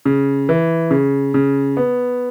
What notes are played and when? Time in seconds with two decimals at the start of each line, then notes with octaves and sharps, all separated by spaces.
0.06 C#3
0.49 E3
0.91 C#3
1.34 C#3
1.77 B3